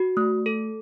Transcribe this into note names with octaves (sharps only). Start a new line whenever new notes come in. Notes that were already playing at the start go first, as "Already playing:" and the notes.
Already playing: F#4
A3
A4